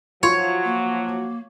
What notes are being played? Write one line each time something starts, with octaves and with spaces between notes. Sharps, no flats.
F3 F#3 F4 F#4 C#5 C6
A#3